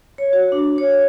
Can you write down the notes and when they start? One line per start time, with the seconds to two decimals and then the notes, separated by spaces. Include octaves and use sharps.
0.18 C#5
0.33 F#4
0.52 D4
0.78 C#5